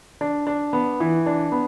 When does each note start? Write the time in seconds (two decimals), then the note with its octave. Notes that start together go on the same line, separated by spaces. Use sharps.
0.21 D4
0.47 D4
0.73 B3
1.00 E3
1.26 D4
1.52 B3